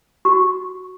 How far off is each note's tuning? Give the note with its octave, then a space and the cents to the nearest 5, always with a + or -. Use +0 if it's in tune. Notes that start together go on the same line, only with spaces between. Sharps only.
F#4 +0 C#6 -5